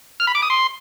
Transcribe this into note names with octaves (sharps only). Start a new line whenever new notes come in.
F6
B5
D6
D#6
C6